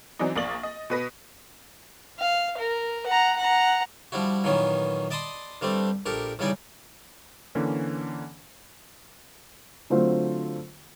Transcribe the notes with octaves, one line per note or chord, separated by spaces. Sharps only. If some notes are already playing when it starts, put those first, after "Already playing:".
E3 F#3 C4 D4 D#4
A#1 A#3 D4 D#6 A6 F#7
D#5
B2 B4 A#6 B6
F5
A#4
F#5 A#5
F#5 A#5
F3 G3 D4 E4 F#4
A#2 D#3 E3 F#3 B3 C#4
D5 D#5 A5 B5 C6 D#6
G2 G3 A3 C4 D4
A#1 G4 A4 A#4
E2 C#3 G3 D#4 D5 G#5
D3 E3 A#3 C#4
D3 F#3 A3 C4 F4 C5